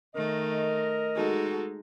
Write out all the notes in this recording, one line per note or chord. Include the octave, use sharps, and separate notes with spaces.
D#3 A3 A#4 D#5
G#3 D#4 F#4 A4